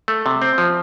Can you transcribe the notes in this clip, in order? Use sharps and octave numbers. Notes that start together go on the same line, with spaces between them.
A3
C3
C4
F3